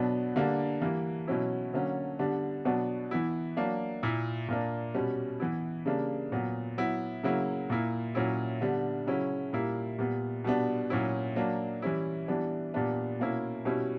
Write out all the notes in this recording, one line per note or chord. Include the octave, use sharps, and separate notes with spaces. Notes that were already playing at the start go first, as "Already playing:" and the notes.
Already playing: B2 F#3 B3 D4
D3 G3 A#3 D4
E3 G3 A#3
B2 F#3 C#4 E4
D3 F#3 A#3 C#4
D3 G3 B3 D4
B2 F#3 B3 D4
E3 B3 E4
F#3 A#3 D4
A#2 A#3 E4
A#2 A#3 D4
B2 G3 C#4
E3 B3 E4
C#3 G3 A#3 D4
A#2 F#3 B3
F#3 B3 E4
C#3 F#3 A#3 E4
A#2 A#3 E4
A#2 F#3 C#4 E4
D3 G3 B3 D4
C#3 F#3 C#4 E4
A#2 G3 A#3 E4
A#2 G3 B3
B2 G3 B3 D4
A#2 F#3 C#4 E4
F#3 A#3 D4
E3 G3 C#4 E4
E3 G3 B3 D4
A#2 G3 B3 D4
B2 A#3 C#4 E4
B2 G3 C#4 E4